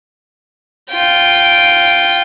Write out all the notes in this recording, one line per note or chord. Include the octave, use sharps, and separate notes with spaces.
F4 G5